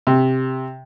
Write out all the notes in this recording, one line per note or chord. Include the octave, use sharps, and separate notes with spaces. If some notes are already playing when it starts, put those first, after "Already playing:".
C3